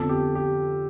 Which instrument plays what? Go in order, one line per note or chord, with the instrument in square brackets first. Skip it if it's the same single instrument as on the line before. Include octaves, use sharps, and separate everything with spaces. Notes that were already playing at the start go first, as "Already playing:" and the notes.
Already playing: [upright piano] F2 D3 F3 B3 [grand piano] A4
[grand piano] G4
G4